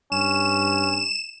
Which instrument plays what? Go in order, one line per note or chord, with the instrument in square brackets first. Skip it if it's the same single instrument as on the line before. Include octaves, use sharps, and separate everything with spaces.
[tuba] G2 [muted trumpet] C#4 [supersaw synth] E7